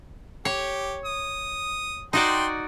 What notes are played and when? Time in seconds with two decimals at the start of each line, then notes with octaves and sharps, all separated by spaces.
0.45 G4 C#5
1.05 D#6
2.13 D#4 F#4 D5 G5 C6